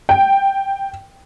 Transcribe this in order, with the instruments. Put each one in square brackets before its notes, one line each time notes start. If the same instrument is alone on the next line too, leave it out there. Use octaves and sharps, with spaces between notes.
[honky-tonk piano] G5